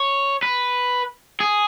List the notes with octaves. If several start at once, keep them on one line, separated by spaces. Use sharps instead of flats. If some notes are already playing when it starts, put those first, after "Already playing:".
Already playing: C#5
B4
G#4